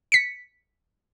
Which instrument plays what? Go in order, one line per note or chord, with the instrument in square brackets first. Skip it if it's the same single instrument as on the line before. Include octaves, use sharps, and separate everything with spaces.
[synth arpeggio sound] B6 C#7